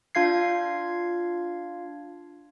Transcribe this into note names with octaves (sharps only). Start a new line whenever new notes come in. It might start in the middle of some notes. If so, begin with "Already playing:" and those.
D4 F4 F5 G#6 C7